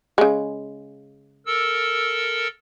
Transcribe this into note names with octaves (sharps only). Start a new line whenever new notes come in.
C#3 G#3
A4 A#4 E6